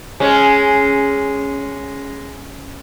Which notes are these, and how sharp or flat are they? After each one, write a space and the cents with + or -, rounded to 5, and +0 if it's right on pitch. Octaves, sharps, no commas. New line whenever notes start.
G#3 +0 C#4 +0